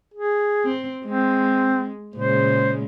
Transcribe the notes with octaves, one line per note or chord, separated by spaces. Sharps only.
G#4
C4
G#3 C4
A#2 C#3 G#3 C5